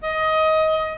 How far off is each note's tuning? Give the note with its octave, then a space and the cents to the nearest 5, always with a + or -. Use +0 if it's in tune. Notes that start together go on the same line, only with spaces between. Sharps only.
D#5 +20